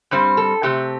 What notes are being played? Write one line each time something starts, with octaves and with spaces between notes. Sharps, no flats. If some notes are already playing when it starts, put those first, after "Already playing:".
G2 G3 C4 C5
A4
C3 A3 C4 G4